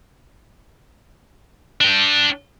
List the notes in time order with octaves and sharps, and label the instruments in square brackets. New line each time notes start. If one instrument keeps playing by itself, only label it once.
[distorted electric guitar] D4 G5